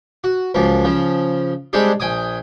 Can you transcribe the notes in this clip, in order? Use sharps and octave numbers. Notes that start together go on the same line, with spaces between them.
F#4
C#2 F#2 F3 A#3
C#3 F3
G3 G#3 C4 D4 G4 G#4
A#1 G5 G#5 D#6